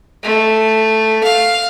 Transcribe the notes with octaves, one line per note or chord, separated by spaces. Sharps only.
A3
F5